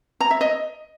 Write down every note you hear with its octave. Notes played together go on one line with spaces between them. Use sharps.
A#5
E5
D#5